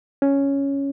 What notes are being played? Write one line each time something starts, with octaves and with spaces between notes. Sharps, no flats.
C#4